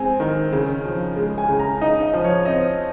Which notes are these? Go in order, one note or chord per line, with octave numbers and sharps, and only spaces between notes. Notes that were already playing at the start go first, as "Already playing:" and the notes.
Already playing: G#3 C4 G#5
D#3
C#3
F3
G#3
G#5
C#3
A#5
D#4 D#5
D#5
F3
C#5
C4 D#5